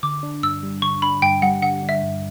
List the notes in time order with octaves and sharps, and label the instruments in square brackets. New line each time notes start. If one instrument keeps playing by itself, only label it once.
[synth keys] D3 [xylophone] D6
[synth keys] D4
[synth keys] G2 [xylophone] E6
[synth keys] G3
[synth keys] D3 [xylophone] C#6
[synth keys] D4 [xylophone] B5
[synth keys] G2 [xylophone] G5
[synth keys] G3 [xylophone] F#5
[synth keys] D3 [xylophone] F#5
[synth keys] D4
[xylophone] E5
[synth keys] G2